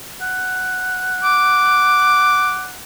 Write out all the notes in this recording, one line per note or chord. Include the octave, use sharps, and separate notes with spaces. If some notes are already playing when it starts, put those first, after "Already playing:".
F#5
D6